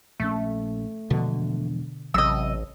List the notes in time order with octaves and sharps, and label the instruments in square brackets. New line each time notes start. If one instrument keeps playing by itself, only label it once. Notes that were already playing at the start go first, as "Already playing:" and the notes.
[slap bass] A#1 C#4 [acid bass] A3
[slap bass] E1 F3 D4 [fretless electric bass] B2 D3
[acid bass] A1 [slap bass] C3 F#3 [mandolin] D#5 E6